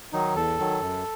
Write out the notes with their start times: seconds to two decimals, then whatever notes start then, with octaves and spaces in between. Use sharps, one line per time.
0.13 D#3 F#3 D#4
0.35 E2 A4
0.59 D#3 F#3
0.81 F#2